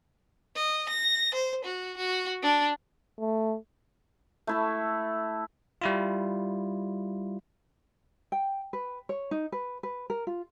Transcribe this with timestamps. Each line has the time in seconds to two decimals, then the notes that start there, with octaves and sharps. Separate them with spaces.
0.56 D#5
0.89 A#6
1.35 C5
1.65 F#4
1.97 F#4
2.43 D4
3.20 A3
4.47 A3 E4 A4
5.82 G3 E4 F4
8.32 G5
8.73 B4
9.09 C#5
9.31 D#4
9.52 B4
9.83 B4
10.10 A#4
10.27 F4